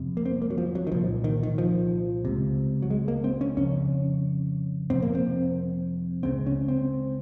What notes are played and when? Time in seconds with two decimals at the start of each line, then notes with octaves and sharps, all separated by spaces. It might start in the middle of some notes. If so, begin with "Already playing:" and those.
Already playing: F2 C3
0.17 A#3
0.26 C4
0.42 A#3
0.50 F#3
0.58 F3
0.75 F#3
0.87 D#3
0.91 C2 A#2 F3
1.24 D#3
1.43 D#3
1.58 F3
2.25 C#2 C3
2.82 F#3
2.90 G#3
3.08 A#3
3.24 C4
3.41 C#4
3.57 F2 C#3 C#4
4.90 F2 C3 C4
5.02 A#3
5.15 C4
6.23 C#2 C#3 C4
6.47 C#4
6.68 C4